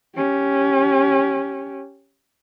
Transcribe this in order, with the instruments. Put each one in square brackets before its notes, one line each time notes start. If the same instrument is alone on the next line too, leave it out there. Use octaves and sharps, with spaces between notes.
[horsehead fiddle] C#4 G4